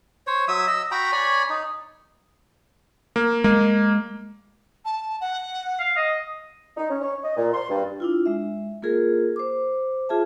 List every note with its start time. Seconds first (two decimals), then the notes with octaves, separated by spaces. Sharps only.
0.27 C5 C#5
0.48 F#3 E5 D#6 E6
0.67 D#5 E6
0.91 F#4 G5 A#5 B5
1.12 C#5 D5 G#5 B5
1.50 D#4
3.16 A#3
3.44 G#3 A#3
4.84 A5
5.20 F#5
5.80 F5
5.97 D#5
6.77 D#4
6.89 C#4
7.01 C#5
7.23 D#5
7.36 A#2
7.53 C6
7.69 G2
8.00 D4 E4 F4
8.26 G#3 E5
8.82 A#3 F4 G#4 A#4
9.36 C5 D6
10.09 F4 G#4 E5 A5